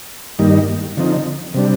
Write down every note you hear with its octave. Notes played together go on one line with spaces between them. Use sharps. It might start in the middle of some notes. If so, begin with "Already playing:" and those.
G2 D#3 G3 A#3 D#4
D3 F3 C4 D#4
C3 G3 D4